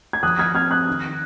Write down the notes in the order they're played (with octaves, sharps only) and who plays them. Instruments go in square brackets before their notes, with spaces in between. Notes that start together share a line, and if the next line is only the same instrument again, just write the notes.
[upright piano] G#6
F3 D#6 F#6
F6 G#6
C4 F6 G#6
D#6 F#6
D#3